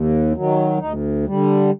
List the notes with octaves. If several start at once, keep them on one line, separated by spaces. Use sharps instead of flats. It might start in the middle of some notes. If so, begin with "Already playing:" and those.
Already playing: D#2
D#3 F#3
D2 D#4
D3 G3